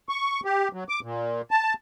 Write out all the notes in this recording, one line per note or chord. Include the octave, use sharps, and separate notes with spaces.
C#6
G4
F#3
D6
A#2
A5